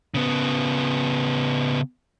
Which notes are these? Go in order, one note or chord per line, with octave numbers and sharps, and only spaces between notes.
C#3 B3